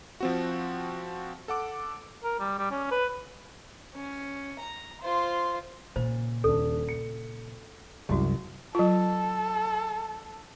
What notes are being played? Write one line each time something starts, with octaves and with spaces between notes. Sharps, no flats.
F3 C4 F#4
A4 F#5 D6
A#4
G3
G3
C#4
B4
C#4
A#5
F4 C5
A#2 C#3 C5
D#1 D4 A4
C#7
C2 F#2 G#3 E4 F#4 G4
F#3 F4 A4